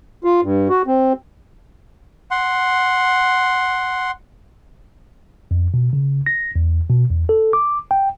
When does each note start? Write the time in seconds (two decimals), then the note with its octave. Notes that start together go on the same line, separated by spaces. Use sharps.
0.24 F4
0.42 G2
0.69 F#4
0.87 C4
2.31 F#5 C6
5.51 F2
5.74 B2
5.93 C#3
6.26 A#6
6.56 E2
6.90 B2
7.10 E2
7.29 A4
7.53 D6
7.91 G5